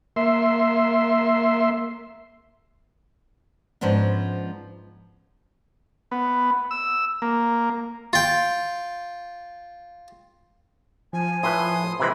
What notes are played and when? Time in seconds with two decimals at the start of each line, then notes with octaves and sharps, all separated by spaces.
0.16 A#3 E5 C6
3.81 G#2 F3 B3 C#4 D4
6.11 B3
6.71 E6
7.22 A#3
8.13 F4 G5
11.13 F3 G#5
11.43 A2 B4 C6 D#6
12.00 C3 E3 G#3 B5